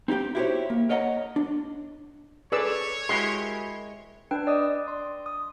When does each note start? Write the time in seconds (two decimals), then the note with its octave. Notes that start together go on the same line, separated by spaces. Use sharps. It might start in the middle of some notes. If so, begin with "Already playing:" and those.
0.08 C4 D#4 F#4 G4 G5
0.35 E4 F#4 G4 A4 C5 C#5
0.70 A#3
0.89 A#4 C#5 D#5 F#5 A5 A#5
1.36 D4
2.52 G#4 A4 B4 C#5 D5 E6
3.09 G#3 E4 F#4 G4 A#4 C6
4.31 D4 B4 G5
4.47 D5 D#5 D#6
4.88 C6
5.26 D#6